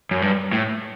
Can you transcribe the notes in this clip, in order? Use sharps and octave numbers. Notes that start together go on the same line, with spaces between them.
F#2
G2
A2